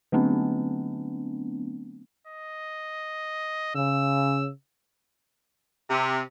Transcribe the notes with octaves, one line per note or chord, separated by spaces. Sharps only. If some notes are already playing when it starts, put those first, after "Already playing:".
D3 F#3 A3 B3 C4 D4
D#5
C#3 E6
C3